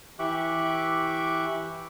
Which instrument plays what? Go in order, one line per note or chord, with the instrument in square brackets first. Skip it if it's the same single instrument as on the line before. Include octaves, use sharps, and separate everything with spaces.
[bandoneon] E3 G4 E5 C#6 D6 F#6